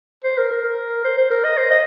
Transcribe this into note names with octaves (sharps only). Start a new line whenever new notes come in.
C5
A#4
A#4
A#4
C5
C5
A#4
D#5
C5
D#5